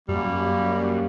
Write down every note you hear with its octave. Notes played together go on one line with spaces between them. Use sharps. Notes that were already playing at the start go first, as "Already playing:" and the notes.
F#2 G3 A#3